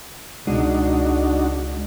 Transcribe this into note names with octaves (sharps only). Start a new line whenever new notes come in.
C#2 B2 G#3 D4 D#4 F#4